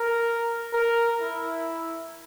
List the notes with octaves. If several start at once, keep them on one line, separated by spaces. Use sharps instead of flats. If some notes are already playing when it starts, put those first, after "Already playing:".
Already playing: A#4
A#4
E4